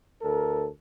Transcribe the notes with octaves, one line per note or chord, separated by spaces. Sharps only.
D2 A4 A#4